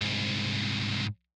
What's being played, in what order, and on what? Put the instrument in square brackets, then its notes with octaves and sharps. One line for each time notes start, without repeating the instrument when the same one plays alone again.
[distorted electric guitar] C2 G#2